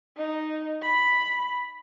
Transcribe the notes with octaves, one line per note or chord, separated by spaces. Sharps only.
D#4
B5